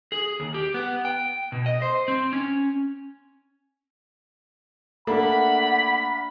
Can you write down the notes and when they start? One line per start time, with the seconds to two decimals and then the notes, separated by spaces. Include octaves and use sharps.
0.12 G#4
0.40 D#2
0.54 G4
0.74 B3
1.05 G5
1.52 B2
1.66 D#5
1.82 C5
2.08 C4
2.33 C#4
5.07 A3 A#3 D4 F#5 B5